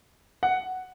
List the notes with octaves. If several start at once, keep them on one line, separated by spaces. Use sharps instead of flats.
F#5